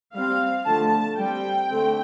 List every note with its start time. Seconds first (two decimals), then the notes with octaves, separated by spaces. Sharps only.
0.14 G3 C4 F5
0.66 D3 F3 A3 A5
1.18 G3 C4 G5
1.69 D3 A3 C4